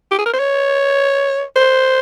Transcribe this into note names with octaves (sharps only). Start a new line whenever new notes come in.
G4
G#4
A#4
C5
C#5
C5